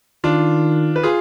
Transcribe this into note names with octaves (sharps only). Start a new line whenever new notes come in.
D#3 D4 F4
B4
F4 G#4